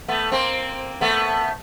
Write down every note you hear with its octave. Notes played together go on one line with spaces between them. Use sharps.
A3 B3
A#3 C4
A3 B3